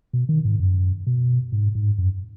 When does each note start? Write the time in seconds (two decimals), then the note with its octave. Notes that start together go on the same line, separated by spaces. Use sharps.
0.13 B2
0.29 D#3
0.45 G#2
0.59 F#2
1.07 B2
1.52 G#2
1.75 G#2
1.98 F#2